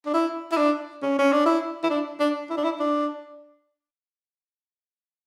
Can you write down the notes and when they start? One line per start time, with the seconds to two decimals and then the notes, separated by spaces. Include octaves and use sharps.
0.06 D4
0.14 E4
0.52 E4
0.57 D4
1.02 C#4
1.18 C#4
1.32 D4
1.46 E4
1.83 E4
1.90 D4
2.20 D4
2.50 E4
2.57 D4
2.64 E4
2.79 D4